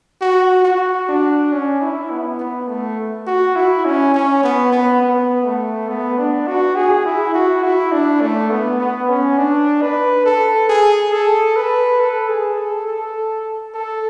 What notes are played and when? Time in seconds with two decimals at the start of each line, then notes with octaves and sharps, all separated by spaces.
0.21 F#4
0.65 F#4
1.08 D4
1.53 C#4
1.81 E4
2.11 B3
2.39 B3
2.68 A3
3.27 F#4
3.56 E4
3.85 C#4
4.14 C#4
4.43 B3
4.72 B3
5.02 B3
5.45 A3
5.89 B3
6.18 D4
6.47 F#4
6.76 G#4
7.06 E4
7.34 F#4
7.63 E4
7.92 D4
8.21 A3
8.51 B3
8.80 B3
9.09 C#4
9.38 D4
9.82 B4
10.26 A4
10.69 G#4
11.13 A4
11.56 B4
12.00 A4
12.29 G#4
12.58 A4
12.87 A4
13.75 A4